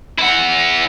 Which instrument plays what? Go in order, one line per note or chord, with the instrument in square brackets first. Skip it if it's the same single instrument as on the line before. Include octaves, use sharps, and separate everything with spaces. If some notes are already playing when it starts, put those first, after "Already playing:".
[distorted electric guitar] E4 F#5